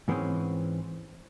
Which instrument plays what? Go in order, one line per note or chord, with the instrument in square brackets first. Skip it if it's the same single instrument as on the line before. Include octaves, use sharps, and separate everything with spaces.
[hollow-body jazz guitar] G#2 E3 G#3 C4 C#4